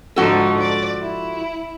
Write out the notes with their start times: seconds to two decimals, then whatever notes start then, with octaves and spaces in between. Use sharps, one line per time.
0.16 G#2 D3 F3 D#4 F#4 A4
0.58 D5
1.00 E4